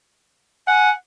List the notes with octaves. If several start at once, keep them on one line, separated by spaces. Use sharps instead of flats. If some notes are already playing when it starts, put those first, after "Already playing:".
F#5 G#5